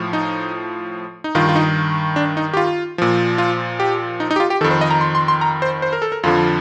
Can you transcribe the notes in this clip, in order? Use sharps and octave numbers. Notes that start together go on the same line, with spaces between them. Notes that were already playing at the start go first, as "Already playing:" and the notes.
Already playing: A2 F3
D#4
D#4
G2 D#3 F4
F4
D#4
D4
D#4
G4
F4
A#2 F3
F4
G4
D#4
D#4
G4
F4
G4
F2 D#3 A4
C5
D#5
A#5
C6
C6
C6
A#5
C5
C5
A#4
A4
A#4
F2 D3 F3 F4